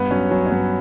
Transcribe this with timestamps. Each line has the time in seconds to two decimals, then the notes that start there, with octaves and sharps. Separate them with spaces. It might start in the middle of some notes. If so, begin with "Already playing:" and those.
Already playing: G2 B3
0.11 F#3 C#4
0.31 F#3 C#4
0.47 C#4
0.50 G2 B3